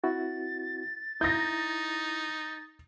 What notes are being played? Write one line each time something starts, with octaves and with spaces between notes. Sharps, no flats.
C4 E4 F#4 A6
D#4 E4 A#5 G6 A#6